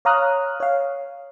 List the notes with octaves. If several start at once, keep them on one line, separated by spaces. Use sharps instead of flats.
C#5 F5 A#5 D#6 F6 F#6
C#5 F5